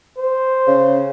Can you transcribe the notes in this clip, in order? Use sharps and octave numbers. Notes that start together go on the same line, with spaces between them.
C5
C#3